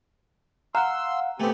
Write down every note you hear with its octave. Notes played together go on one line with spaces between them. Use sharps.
F5 F#5 A#5 C6 E6
A3 B3 C4 G4 G#5